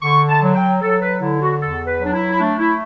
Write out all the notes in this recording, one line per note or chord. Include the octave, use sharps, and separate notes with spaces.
D3 C#6
A5
F#3
G5
F#3 A4
B4
D3 E4
F#4
E2 A4
B4
F#3 D4
E4
E4
A3 D4
E4